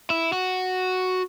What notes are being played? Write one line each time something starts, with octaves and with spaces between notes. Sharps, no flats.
E4
F#4